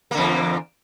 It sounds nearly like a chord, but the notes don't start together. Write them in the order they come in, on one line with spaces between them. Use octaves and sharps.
A#3 D3 E2